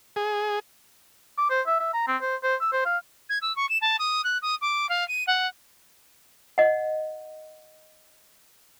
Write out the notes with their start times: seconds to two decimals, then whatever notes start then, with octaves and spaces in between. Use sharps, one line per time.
0.16 G#4
1.38 D6
1.50 C5
1.67 E5
1.80 E5
1.94 A#5
2.08 C4
2.21 C5
2.43 C5
2.61 E6
2.73 C5
2.86 F5
3.29 G#6
3.41 E6
3.56 C#6
3.69 E7
3.81 A5
3.99 D#6
4.24 F#6
4.42 D#6
4.61 D6
4.89 F5
5.08 D#7
5.27 F#5
6.58 D#5 F#5